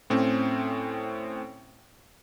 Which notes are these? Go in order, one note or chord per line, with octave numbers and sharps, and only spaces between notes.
A2 C4 C#4